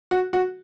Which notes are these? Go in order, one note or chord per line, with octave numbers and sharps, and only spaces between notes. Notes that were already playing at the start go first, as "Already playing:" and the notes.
F#4
F#4